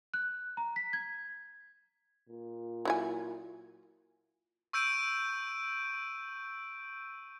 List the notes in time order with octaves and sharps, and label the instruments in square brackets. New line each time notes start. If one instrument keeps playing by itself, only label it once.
[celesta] F#6
A#5
B6
G#6
[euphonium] A#2
[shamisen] F#3 E4 G#5
[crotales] C#6 E6 G6 D7 D#7